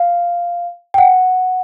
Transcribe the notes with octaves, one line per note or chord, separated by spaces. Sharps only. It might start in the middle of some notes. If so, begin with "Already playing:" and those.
Already playing: F5
G5
F#5